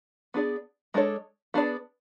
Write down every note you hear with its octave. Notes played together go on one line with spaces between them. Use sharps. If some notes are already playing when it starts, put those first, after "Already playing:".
B3 D4 G#4 D5
G#3 D4 A4 C#5
B3 D4 G#4 D5